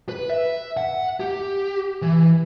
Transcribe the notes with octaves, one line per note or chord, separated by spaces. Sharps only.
B4
E5
F#5
G4
E3